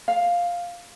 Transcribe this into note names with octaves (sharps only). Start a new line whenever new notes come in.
F5